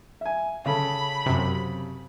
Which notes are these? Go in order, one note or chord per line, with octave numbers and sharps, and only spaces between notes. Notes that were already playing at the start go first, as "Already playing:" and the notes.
E5 G#5
C#3 A4 B5
F#2 C3